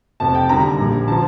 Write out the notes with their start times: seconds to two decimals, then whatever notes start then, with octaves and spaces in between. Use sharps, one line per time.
0.20 F1 F2 C3 A5
0.35 G5
0.49 D#2 D3 G3 A#5
0.78 A#1 A#2 G3
1.08 D3 F3 A5